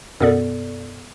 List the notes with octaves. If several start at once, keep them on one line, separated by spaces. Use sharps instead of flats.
F#2 B2 B3 A4 D5